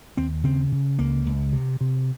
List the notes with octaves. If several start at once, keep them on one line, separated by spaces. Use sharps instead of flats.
D#2 C4
C#3 C4
C#3
C#2 A#3
C#2
C3
C3